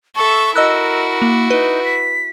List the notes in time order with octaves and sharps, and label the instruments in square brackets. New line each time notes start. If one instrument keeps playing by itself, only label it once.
[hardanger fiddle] A4 E5 [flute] C#6
[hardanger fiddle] E4 F#4 [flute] A#4 [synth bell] D#5 E6 F#6
[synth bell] A#3
[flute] D#4 [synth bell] B4
[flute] B6